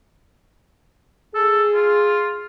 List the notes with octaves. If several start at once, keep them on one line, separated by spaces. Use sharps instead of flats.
G#4 A4
F4